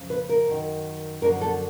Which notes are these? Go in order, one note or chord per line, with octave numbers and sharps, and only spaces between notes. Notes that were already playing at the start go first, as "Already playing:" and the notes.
Already playing: F2 C#3 F3
B4
A#4
F#2 D#3
F#2 D3 F3 A#4
A4